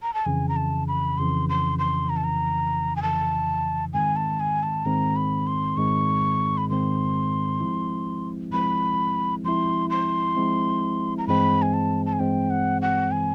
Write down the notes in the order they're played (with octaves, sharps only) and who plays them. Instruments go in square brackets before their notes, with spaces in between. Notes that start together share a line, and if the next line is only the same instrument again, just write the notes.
[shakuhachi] A#5
A5
[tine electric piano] F2 C#3 E3 [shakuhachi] G#5
[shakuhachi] A#5
A5
B5
[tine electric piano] F2 C#3 E3 [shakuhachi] C6
[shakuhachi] C6
C6
[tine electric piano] F2 C#3 E3 [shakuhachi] A#5
[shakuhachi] A5
A#5
G#5
[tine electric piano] F2 C#3 E3 [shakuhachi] A5
[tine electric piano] G#2 D#3 G#3 C4 [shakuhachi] G#5
[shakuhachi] A5
G#5
A5
[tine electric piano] G#2 D#3 G#3 C4 [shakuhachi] A#5
[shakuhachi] B5
C6
[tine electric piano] G#2 D#3 G#3 C4 [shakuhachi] C#6
[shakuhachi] B5
[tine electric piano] G#2 D#3 G#3 C4 [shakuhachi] C6
[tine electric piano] F3 G#3 C4 E4
[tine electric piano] F3 G#3 C4 E4 [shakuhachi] B5
[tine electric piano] F3 G#3 C4 E4 [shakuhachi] C6
[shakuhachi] C6
[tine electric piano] F3 G#3 C4 E4
[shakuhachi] A#5
[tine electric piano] G2 E3 G#3 C4 [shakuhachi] B5
[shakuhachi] G#5
A5
A5
G#5
[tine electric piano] G2 E3 G#3 C4 [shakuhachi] G5
[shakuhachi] F#5
F#5
[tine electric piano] E3 G#3 C4 [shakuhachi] G#5